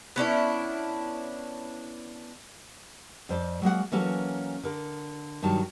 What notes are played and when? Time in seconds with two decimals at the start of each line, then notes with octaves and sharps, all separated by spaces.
0.16 B3 C#4 D4 E4
3.29 F2 C5 D5
3.62 F#3 G#3 A#3 F#5
3.92 E3 F#3 A#3 C#4 A4
4.63 D3 A#4
5.43 G2 D#3 F#3 A5